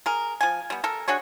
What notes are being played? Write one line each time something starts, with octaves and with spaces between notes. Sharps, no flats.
G#4 A#4
F3 G#5
G3 B3
A4 A#4
D4 F#4 G#4 C#5